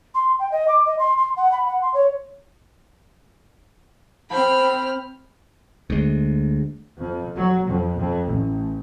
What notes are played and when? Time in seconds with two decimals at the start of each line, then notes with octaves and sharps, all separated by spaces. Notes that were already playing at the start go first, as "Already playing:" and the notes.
0.15 C6
0.39 G5
0.52 D#5
0.68 D6
0.86 D#5
0.99 C6
1.18 C6
1.37 F#5
1.52 B5
1.66 F#5
1.82 C6
1.94 C#5
4.30 C4 C5 B5 F6
5.90 D2 G#3
6.96 F2
7.36 F#3
7.68 F2
7.99 F2
8.28 A1